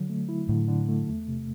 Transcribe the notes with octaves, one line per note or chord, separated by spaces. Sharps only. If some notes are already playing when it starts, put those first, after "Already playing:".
Already playing: D3 F#3
A3
E4
A2 D3
D3
A3
E2
C3